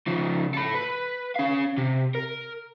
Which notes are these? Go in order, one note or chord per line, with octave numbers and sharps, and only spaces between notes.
C#3 F3
A4 B5
B4
C#4 F5
C3
A#4